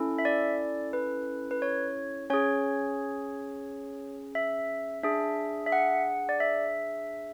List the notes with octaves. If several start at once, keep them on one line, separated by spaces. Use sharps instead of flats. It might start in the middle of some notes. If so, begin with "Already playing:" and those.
Already playing: C#4 E4 A4
E5
D5
B4
B4
C#5
C#4 G#4 C#5
E5
D4 G#4 E5
E5
F#5
D5
E5